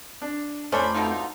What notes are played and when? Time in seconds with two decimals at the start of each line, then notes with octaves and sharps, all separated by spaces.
0.22 D4
0.72 F2 A3 C#4 D4 C5 B5 D6
0.94 B2 D3 D#4 F4